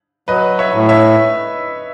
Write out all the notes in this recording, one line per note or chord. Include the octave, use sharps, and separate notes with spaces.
F#3 B4 D#5
C#5 E5
A2
C#5 E5